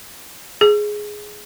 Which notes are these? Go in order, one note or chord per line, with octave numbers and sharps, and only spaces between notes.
G#4